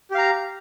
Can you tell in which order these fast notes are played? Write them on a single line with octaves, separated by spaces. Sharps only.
G4 F5 A#5